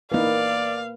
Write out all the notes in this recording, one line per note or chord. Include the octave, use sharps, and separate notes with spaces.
E3 A#3 D#4 B4 D5 F5